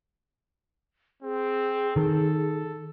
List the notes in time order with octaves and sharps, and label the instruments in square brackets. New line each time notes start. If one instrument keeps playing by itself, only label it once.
[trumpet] C4 [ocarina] G#4
[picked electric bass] D#3 [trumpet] A4